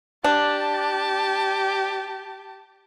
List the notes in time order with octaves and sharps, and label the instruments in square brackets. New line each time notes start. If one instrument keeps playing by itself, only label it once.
[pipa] D4 [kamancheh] G4 A5